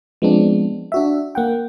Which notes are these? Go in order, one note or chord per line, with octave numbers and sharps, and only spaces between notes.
F3 G#3 B3 C4 D4
D4 F#4 E5
A#3 F#5 G5